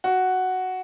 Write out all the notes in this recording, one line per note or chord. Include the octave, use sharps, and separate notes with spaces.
F#4